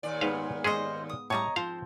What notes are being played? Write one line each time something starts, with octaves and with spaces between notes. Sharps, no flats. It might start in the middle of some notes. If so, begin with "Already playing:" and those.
D#2 A#2 D5
G#2 B3 B4 C5 F5
G#3 C#4 G#4 C5 D#5
D#6
A2 G3 C#5 D#5 A#5
F3 C4 C5 F5